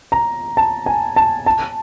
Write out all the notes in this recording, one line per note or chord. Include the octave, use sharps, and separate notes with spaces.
A#5
A5
G#5
A5
A5